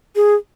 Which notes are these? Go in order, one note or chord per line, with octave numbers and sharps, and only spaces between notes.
G#4